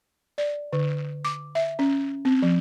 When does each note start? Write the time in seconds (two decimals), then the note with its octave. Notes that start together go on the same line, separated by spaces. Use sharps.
0.38 D5
0.73 D3
1.25 D6
1.55 E5
1.79 C#4
2.25 C4
2.42 F3